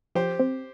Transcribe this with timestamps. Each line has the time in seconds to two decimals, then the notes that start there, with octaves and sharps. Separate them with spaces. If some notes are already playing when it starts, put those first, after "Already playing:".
0.15 F3 G4 C5
0.39 C4